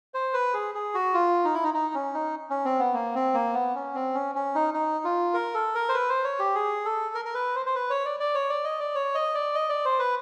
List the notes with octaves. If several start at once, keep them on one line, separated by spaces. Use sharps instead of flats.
C5
B4
G#4
G#4
F#4
F4
D#4
E4
D#4
D#4
C#4
D#4
C#4
C4
B3
A#3
C4
A#3
B3
C#4
C4
C#4
C#4
D#4
D#4
F4
A#4
A4
A#4
C5
B4
C5
C#5
G4
G#4
A4
A#4
A#4
B4
C5
C5
B4
C#5
D5
D5
C#5
D5
D#5
D5
C#5
D#5
D5
D#5
D5
C5
B4